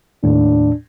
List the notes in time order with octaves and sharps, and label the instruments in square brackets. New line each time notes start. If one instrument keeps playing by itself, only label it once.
[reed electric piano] D#2 A2 [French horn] D4